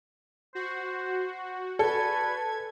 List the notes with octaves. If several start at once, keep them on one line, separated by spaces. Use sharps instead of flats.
F#4 C5
F#4 A4 B4 D5 G#5 G#6